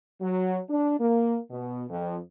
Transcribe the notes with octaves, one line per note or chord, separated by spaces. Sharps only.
F#3
D4
A#3
B2
F2